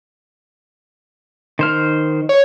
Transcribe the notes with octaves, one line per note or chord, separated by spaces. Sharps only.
D#3 C5 F6
C#5